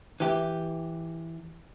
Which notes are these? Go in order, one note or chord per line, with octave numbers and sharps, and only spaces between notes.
E3 G4